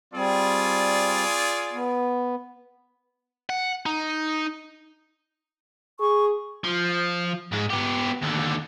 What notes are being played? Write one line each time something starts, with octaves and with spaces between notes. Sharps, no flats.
G3 C4 F4 G#4 D5
B3
F#5
D#4
G#4 C#6
F3
G#2 G#3
B3 G4
D#2 D3